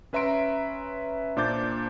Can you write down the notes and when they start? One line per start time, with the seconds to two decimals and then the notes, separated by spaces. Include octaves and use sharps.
0.13 C#4 B4 E5 A#5 C6 D7
1.37 A#2 D4 C5 D6 G6 A6